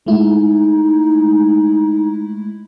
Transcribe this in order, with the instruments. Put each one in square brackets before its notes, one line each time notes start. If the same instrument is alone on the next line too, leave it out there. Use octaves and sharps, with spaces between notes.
[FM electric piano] G#3 A3 E4 [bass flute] D#4